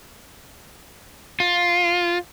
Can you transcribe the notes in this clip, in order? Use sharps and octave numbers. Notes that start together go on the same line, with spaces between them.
F4